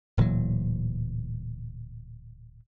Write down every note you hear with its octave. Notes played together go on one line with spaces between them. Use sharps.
D1 A#2 E3 F#3